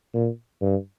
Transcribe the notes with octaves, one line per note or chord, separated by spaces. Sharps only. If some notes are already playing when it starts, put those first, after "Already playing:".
A#2
G2